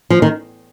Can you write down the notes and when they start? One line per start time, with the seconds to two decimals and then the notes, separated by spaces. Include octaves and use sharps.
0.10 F3
0.22 D#3